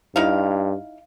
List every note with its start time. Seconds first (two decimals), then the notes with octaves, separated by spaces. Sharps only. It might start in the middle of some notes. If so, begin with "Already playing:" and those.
0.16 G2 D#4 E4 F5